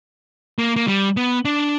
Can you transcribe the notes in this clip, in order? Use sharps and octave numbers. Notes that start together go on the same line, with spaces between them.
A#3
A#3
G3
B3
D4